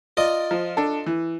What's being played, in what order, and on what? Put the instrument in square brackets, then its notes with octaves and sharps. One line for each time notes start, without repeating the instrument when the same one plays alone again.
[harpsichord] F4 A#4 D#5 [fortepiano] D5
[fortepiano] F3
D4 A4
E3